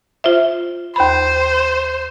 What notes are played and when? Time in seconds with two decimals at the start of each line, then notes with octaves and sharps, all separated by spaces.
0.24 F4 C5 E5
0.96 D#2 C5 B5